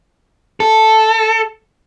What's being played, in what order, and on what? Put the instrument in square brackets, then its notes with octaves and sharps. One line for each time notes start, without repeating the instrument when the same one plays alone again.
[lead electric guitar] A4